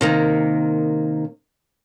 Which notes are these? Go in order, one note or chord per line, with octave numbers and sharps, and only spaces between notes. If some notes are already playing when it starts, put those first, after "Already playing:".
C3 D#3 A#3